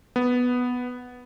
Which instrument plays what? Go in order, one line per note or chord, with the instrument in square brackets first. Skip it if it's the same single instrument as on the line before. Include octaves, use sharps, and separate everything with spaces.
[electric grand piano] B3